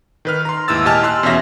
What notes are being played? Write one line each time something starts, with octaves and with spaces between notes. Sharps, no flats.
D#3 B4 F6
A#5 C6
D#2 G#2 E4 E6 A6
A#2 G4 D#5 G#5 A5 F6
C6 E6 F#6
E2 B2 C#4 E5 A#6